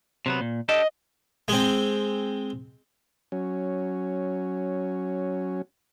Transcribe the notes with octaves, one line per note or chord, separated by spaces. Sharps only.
C3 F#3 B3
A#2
D4 G4 A4 D#5
G#3 C4
F#3 C#4